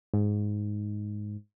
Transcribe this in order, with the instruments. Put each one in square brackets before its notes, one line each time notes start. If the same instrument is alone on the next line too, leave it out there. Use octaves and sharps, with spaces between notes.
[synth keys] G#2